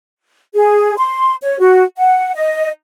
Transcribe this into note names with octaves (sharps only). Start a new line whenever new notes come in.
G#4
C6
C#5
F#4
F#5
D#5